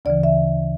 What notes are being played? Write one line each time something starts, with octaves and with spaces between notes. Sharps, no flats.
D2 C#3 E3 D5
E5